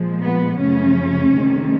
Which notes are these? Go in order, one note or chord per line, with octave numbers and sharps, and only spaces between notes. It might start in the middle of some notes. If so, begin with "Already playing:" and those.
Already playing: A#2 F3 G#3
B3
F#2 C#3 F3 A3 C#4
D2 C3 D#3 G#3